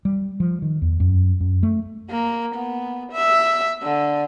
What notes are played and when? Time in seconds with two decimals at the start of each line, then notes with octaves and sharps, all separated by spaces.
0.05 G3
0.40 F3
0.62 D#3
0.82 E2
1.00 F#2
1.41 F#2
1.63 A3
2.10 A#3
2.55 B3
3.12 E5
3.82 D3